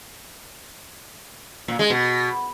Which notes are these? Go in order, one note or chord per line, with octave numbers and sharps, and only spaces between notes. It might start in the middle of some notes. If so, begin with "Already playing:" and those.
A#2
G#3
B2